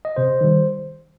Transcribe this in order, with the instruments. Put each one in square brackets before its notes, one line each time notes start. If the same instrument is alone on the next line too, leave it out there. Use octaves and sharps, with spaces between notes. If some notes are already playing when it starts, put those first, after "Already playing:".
[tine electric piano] D#5
C3 C5
D#3 G3